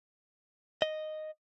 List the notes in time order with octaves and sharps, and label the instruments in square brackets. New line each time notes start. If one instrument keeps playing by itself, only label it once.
[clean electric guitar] D#5